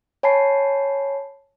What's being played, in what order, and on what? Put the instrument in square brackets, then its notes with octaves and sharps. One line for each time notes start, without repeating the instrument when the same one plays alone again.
[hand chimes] C#5 G#5 A5 B5 C7